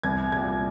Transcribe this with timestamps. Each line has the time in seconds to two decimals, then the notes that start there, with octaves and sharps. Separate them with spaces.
0.03 C2 G#6
0.32 A#2 G3 G#6